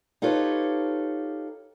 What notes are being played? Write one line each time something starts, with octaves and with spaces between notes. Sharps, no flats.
D#4 F4 G4 A4 B4 C#5